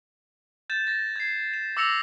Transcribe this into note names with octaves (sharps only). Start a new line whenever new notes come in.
G6 A6 E7
A6 A#6
G#6 C7
E7
D6 E6 A#6 C#7 F7